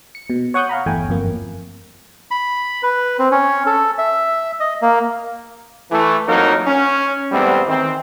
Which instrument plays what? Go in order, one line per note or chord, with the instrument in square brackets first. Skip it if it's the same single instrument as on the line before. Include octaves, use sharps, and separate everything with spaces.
[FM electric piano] C#7
B2
C#5 F#5 C#6 D#6 F#6 G6
F5 F#5 A#5 B5
G1 E2 A3 G5 G#5
G1 F2 A#3
[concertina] B5
B4
C4
C#4
A4
E5
D#5
A#3
[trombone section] E3 A3
F2 F#3 A#3 D#4 A#4
C#4
E2 G#2 G3 A3 B3 C4
D#3 E3 C4